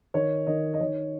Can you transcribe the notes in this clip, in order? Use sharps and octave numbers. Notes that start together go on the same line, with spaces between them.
D#3 C#5
D#3 D#5
D#5
D#3 C#5